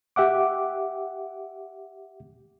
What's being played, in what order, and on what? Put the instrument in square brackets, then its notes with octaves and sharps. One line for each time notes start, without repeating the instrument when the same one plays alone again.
[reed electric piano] G4 E5 F#5 D6